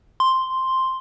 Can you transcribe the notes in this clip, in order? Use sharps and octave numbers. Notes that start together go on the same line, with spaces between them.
C6